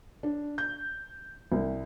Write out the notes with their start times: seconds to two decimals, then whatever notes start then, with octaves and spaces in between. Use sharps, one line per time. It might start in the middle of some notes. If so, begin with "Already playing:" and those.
0.23 D4
0.58 G6
1.52 C2